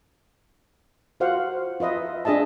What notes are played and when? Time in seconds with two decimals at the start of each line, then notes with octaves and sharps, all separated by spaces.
1.20 F4 F#4 C5 F5 F#5
1.80 F4 B4 D#5 E5
2.25 D4 G#4 D#5 E5 A5